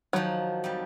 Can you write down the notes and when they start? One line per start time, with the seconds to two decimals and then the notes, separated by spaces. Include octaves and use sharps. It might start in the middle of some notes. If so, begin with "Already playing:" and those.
0.13 D#3 F3 F#3
0.64 F2 G3